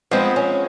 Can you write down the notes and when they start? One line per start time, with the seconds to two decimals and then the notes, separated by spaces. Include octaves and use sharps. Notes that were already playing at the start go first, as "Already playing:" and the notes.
0.11 F3 G#3 B3 C4
0.36 C#4